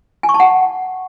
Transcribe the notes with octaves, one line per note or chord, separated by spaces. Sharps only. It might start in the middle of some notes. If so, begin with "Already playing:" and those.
G#5
C#6
A5
F#5